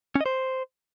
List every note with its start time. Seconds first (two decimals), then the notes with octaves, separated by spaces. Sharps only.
0.15 C#4
0.21 D#5
0.26 C5